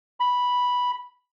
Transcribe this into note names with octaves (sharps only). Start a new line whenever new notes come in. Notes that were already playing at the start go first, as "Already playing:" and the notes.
B5